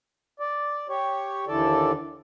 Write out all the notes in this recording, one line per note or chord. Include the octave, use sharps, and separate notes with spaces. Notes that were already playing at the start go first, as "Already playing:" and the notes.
D5
G4 C#5
D#2 D3 E3 A4 D5